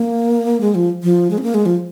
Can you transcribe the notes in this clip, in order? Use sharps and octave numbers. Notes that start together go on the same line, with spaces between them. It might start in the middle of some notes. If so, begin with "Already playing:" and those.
Already playing: A#3
G#3
F3
F3
G#3
C#4
A#3
G#3
F3